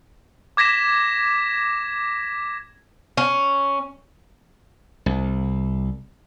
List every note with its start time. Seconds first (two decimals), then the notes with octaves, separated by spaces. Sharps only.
0.57 D6 G#6 A#6 B6 E7
3.17 C#4
5.06 C2